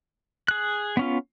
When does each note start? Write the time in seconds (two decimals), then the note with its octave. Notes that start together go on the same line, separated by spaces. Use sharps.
0.48 G#4 F#6
0.97 B3 C#4 F4